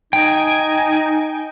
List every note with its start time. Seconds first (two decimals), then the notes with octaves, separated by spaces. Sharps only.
0.13 D#4 G5 G#5